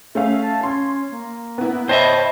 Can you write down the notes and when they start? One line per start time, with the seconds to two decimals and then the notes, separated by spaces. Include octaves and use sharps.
0.15 A3 C#4 E5 F5
0.42 A5
0.63 C#4 C6
1.11 A#3
1.58 B3 E4
1.89 C5 C#5 D#5 E5 G5 A5 B5